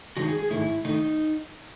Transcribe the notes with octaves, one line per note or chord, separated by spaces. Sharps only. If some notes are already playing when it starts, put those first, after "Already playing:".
D#3 G#3 D#4 F#4
G#4
G#4
G#2 D#3 A3 E4
D#3 A3 D#4